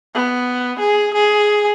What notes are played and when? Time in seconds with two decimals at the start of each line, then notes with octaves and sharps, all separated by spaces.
0.15 B3
0.79 G#4
1.14 G#4